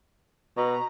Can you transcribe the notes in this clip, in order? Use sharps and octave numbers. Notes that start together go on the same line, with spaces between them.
B2 A#5